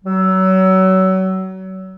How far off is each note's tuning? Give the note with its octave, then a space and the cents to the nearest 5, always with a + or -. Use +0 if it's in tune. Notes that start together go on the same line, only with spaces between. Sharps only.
F#3 +30